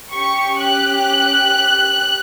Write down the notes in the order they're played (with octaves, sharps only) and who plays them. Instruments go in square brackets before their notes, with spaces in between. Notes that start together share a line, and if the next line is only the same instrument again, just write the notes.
[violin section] C#4 G4 C#6
F#6